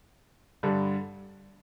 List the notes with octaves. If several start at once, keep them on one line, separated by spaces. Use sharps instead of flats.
G2 D3 G3